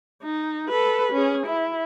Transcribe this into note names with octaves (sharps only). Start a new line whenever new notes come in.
D#4
A4 B4
C#4 G#4
E4